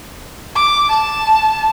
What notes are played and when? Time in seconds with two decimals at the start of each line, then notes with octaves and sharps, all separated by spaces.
0.56 D6
0.89 A5